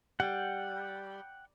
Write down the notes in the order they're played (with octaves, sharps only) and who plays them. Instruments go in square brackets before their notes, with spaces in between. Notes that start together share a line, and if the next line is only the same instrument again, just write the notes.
[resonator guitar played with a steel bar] G3 [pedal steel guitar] F#5 G5